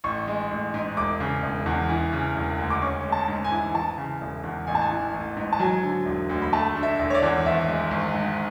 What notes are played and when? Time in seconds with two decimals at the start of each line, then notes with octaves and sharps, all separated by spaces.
0.04 A1 C#6
0.27 G#3
0.51 A1
0.74 G#2
0.97 E1 D6
1.20 C#3
1.43 E1
1.66 E2
1.89 E3
2.13 C#3
2.36 E1
2.59 D2
2.70 D6
2.82 C#4 C#6
3.06 G#3
3.12 A5
3.28 G#2
3.44 G#5
3.52 E3
3.70 G#5
3.74 E3 A5
3.98 C#3
4.21 E1
4.44 E2
4.67 A1 G#5
4.75 A5
4.82 G#5
4.90 E3
5.14 A1
5.37 G#2
5.53 A5
5.60 F#3 G#5
5.83 D3
6.06 E1
6.30 D2
6.42 B5
6.53 A3 A5
6.75 D3
6.83 E5
6.99 E1
7.10 C#5
7.14 D5
7.22 E2
7.46 G#1 E5
7.68 G#3
7.91 G#1
8.14 G#2